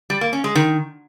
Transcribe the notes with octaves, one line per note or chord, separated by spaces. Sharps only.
G3
A#3
C#4
G#3
D#3